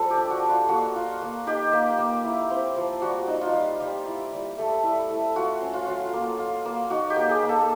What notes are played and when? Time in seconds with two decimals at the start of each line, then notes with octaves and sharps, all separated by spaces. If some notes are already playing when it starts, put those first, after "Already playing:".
Already playing: F3 G3 A4
0.10 G4
0.17 D4
0.30 F#4
0.43 G3
0.49 F4
0.69 A#3 F#4
0.96 F4
1.22 A#3
1.47 D#4 G4
1.73 A#3
1.98 A#3
2.24 E4
2.50 C4
2.76 F3
3.02 G3 F#4
3.28 D#4
3.41 F4
3.53 G3
3.80 G3
4.06 E4
4.32 G3
4.58 A3
4.83 E4
5.10 A3
5.35 F4 F#4
5.62 C#4
5.74 F4
5.87 F#3
6.13 A#3
6.39 F4
6.65 A#3
6.90 D#4 F#4
7.10 G4
7.16 A#3
7.29 G#4
7.42 A#3
7.49 A4